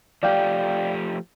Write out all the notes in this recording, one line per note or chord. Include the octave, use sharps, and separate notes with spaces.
F3 A3 G4 D5 F5 G5